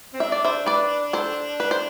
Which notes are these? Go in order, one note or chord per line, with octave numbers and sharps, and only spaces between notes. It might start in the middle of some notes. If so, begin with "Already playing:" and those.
C4
D4 E5
D5
C5 E5
B4 D5
A4 C5
B4
C5